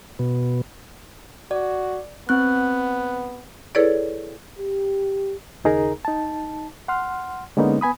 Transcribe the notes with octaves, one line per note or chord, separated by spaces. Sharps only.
B2
F#4 D5
B3 C4 F#6
E4 G#4 A4 B4 C#5 D5
G4
D#2 C#3 D#4 G#4 A#4 A#5
D#4 A5
F#5 C6 F6
D3 G#3 A#3 B3 C#4 D#4
B3 G#5 B5 D#6